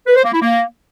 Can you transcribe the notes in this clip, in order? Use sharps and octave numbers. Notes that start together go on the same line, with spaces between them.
B4
C5
A#3
E4
A#3